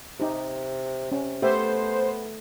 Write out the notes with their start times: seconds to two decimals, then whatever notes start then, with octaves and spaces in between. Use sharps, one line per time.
0.20 C3 D#4 G4
1.12 C3 C#4
1.42 A3 B3 G4 C5 E5